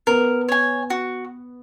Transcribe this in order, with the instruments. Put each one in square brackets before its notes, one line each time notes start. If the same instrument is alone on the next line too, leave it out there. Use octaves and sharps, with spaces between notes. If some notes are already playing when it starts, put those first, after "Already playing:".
[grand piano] B3 [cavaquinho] A#4
[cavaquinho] C#5 G#5
F#4